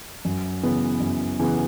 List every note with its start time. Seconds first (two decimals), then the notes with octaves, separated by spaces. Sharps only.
0.25 F#2
0.63 C#3 E3 B3
1.00 F#2
1.39 C#3 E3 B3